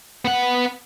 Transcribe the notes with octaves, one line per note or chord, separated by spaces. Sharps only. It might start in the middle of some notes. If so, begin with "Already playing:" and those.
B3 F#5